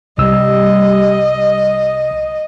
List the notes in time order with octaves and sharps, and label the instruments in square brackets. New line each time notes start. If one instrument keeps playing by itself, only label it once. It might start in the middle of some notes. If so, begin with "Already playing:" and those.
[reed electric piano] C2 E6 [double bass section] G3 [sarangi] D#5